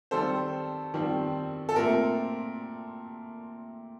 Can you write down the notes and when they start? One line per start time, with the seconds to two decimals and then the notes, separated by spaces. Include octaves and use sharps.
0.11 D#3 G3 C4 A4 C5
0.94 D#3 G3 C4
1.69 A4
1.76 A#2 A3 C4 A#4